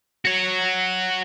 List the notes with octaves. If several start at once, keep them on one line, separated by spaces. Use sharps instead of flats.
F#4 C#5